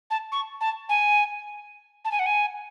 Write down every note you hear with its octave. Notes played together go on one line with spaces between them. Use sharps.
A5
C#6
A5
G#5
A5
G#5
F#5
G#5